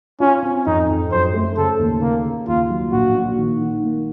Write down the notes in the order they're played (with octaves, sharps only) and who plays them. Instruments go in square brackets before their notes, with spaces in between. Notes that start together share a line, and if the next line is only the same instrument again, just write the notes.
[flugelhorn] C#4 [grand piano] F4
[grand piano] C4
[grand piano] F2 [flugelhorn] D#4
[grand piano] F2
[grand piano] F#2 [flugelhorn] C5
[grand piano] A3
[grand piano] C#3 [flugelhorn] A4
[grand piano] D#2
[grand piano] C#3 [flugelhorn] A#3
[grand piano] C#3
[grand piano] D#2 [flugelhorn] F4
[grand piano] F#3
[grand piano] A#1 [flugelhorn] F#4
[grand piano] A#2
D#3
D#3
A#3